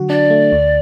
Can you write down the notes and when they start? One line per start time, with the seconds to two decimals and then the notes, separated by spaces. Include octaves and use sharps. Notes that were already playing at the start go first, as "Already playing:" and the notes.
Already playing: D3 F#3 F#4
0.09 D4 D5
0.30 A3
0.52 D2